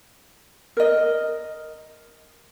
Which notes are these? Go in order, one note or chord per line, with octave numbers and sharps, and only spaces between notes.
A#4 D#5